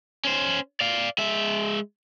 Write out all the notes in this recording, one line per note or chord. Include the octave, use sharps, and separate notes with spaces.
C#4 C5
D5 F5
G#3 E5